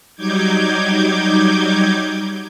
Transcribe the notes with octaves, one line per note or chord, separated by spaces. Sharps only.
F#3 G3 D#4 D6 G6 G#6